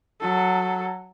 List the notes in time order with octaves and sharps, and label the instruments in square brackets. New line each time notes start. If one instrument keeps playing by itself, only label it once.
[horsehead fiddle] F#3 A4